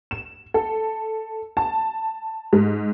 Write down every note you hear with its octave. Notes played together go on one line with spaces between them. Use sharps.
E7
A4
A5
G#2